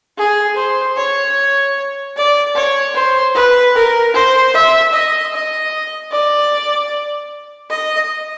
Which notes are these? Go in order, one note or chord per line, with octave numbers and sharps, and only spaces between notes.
G#4
C5
C#5
D5
C#5
C5
B4
A#4
C5
E5
D#5
D#5
D5
D#5